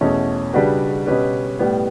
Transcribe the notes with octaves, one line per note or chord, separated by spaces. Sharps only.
E2 B2 A3 C#4
C#3 G3 D4 F#4 B4
B2 G3 C#4 G4 B4
A2 G3 B3